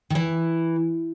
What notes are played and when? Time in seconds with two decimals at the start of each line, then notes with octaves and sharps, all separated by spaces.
0.10 D#3
0.15 E3